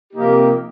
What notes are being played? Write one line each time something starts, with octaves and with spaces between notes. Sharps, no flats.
C3 F3 A#3 D#4 G4